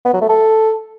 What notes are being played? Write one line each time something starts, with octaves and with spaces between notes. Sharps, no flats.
B3
F#3
A3
A4